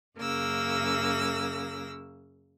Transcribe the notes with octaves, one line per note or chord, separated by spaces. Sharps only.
F#2 C#3 A#3 E6 A#6